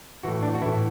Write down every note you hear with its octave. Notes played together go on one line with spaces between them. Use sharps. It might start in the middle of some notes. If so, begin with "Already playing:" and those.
A2 E3 F#4
D4
F#4
A2 E3 E4